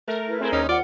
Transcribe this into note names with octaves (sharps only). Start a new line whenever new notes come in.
A3 A#4
E4 B4
C4 E4 G#4 A#4 C5
D#2 C#4 D#4
F4 D5 F#5